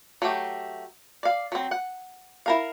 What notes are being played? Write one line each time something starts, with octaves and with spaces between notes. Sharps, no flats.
F#3 A3 G4
D5 F5
F#3 C4
F#5
E4 A#4 F5